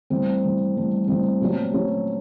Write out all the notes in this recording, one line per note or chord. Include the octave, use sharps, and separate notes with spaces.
G2 E3 A3 C4
G2 E3 A3
G2 E3 A3
G2 E3 A3 C4
A#2 F#3 A3
A#2 F#3 A3 C#4